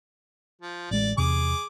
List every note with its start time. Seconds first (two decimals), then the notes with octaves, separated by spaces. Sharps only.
0.62 F3
0.91 A1 G#3 D5
1.18 E2 C3 G#4 D6